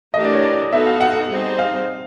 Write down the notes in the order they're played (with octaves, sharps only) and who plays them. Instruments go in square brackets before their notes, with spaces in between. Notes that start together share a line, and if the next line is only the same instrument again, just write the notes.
[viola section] E3 A3 D4 G4 A#4 [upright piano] D#5
[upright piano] D5
C#5
D5
[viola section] B3 D#4 F#4 A4 [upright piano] E5
[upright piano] F5
F#5
[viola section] G3 C4 D#4 G#4 C5
[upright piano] F5